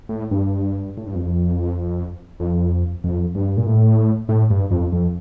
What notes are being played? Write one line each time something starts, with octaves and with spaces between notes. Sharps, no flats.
A2
G2
A2
G2
F2
F2
F2
G2
A#2
A2
A2
G2
F2
F2